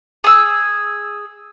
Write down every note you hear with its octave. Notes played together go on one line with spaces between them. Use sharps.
G#4 E6